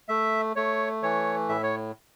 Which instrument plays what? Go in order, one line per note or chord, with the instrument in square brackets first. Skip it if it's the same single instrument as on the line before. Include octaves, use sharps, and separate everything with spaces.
[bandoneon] A3 E5
A3 C#5
E3 C#5
A2 E5
C#5